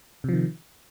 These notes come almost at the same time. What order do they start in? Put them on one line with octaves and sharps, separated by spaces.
C3 F3 D#3